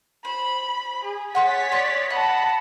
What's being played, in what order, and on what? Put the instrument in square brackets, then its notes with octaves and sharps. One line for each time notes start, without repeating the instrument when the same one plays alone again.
[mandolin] C5 [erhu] B5
[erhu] G#4
[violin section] C#5 A6 B6 [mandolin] F#5 C6 F#6
[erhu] D5 [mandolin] D#5 C6
[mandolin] D#5 [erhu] F#5 [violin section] A5 B5